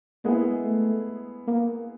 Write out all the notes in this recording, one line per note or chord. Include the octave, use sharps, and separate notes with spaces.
G#3 A#3 B3 E4 G#4
A3
A#3